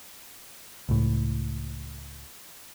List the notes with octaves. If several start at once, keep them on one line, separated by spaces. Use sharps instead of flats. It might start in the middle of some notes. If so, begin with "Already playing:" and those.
C#2 A2